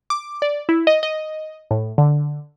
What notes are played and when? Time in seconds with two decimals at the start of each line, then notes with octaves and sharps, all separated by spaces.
0.10 D6
0.42 D5
0.69 E4
0.87 D#5
1.03 D#5
1.71 A2
1.98 D3